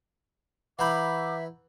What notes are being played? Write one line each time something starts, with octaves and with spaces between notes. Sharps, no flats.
E3 E5 F#5 A#5 B5 D6 G6